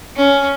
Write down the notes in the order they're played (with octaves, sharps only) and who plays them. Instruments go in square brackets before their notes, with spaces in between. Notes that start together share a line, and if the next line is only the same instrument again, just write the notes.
[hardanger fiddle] C#4